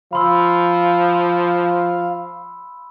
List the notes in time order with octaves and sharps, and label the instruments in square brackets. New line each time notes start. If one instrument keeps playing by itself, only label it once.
[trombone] F3 [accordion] F5 [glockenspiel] B5 C6 E6